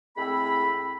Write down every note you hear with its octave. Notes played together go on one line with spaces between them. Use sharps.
A2 G#3 C4 A4 B5